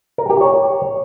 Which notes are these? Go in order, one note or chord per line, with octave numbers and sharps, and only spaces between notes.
A#4
G4
C#5